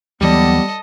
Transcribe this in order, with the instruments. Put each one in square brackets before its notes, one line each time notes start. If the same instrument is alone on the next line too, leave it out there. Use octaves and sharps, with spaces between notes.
[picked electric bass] D#2 E3 F#3 [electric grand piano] G3 D5 [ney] B3 [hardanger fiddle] A4 D#5